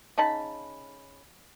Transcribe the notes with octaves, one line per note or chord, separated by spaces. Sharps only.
C#3 D#4 A5 B5